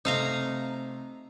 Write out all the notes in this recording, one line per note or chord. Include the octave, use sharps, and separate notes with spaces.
C3 A3 C4 D#4 F5 A#5